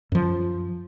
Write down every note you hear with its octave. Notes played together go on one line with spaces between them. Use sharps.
F#2 F3